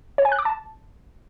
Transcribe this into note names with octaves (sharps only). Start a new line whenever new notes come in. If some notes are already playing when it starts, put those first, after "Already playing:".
C#5
G#5
F#6
D6
A5